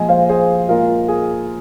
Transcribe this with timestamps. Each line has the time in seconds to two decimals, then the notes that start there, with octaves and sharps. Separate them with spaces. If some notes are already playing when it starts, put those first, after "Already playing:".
Already playing: A#2 F3 G#3 D#5 G#5
0.09 C5 F5
0.29 G#4 C5
0.69 A#2 G#3 F4 A#4
1.08 G#4